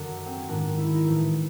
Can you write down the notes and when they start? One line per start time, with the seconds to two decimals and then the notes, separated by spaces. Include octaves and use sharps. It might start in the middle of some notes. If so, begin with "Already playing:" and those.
Already playing: F#2 D3
0.26 C4
0.37 C#4
0.49 G#2 D#3 D4
0.78 E4
0.93 D#4
1.07 A2 E3